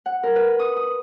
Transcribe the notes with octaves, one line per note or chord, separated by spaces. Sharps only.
F#5
A#4
B4
D#6
D#6